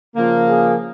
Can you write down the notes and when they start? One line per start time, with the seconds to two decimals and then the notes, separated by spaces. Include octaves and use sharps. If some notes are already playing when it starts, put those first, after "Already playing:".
0.15 C#3 F3 A#3
0.46 G#4